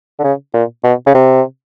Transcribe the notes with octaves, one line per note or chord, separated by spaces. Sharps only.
D3
C#3
A#2
B2
C#3
C3